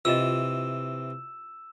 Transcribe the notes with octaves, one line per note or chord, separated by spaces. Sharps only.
C3 E3 F4 D#5 E6 E7